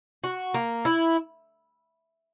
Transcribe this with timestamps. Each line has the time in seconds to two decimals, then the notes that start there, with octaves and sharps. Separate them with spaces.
0.24 F#4
0.54 A#3
0.85 E4